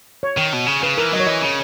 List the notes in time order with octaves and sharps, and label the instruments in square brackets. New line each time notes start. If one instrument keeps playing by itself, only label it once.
[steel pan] C#5
[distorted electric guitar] D#3
B2
C#3
[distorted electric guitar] C#3 [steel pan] B4
[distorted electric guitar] E3 [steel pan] A#4
[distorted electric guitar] F#3 [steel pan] D#5
[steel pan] C#5
[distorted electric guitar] E3 [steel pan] D#5
[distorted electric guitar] C#3